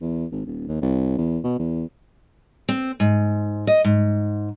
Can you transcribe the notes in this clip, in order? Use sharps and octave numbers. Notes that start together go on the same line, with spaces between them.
E2
G#1
D#1
D#2
C2
E2
B2
E2
C4
G#2
D#5
G#2